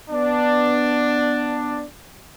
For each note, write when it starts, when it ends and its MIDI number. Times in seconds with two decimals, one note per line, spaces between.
0.10 1.83 59
0.10 1.83 62